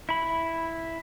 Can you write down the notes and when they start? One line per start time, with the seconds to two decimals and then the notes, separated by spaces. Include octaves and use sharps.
0.09 E4 B5